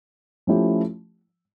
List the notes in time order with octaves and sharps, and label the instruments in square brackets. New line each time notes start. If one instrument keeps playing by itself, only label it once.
[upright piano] F3 A3 C#4 E4 G4